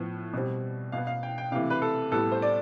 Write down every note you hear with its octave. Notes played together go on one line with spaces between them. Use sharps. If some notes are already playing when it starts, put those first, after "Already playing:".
Already playing: A2 F3 B3
B2 G3 C4
B2 B3 F5
F5
G5
G5
C3 E3 A3 F5
B4
A4
A2 G3 B3 A4
C5
D5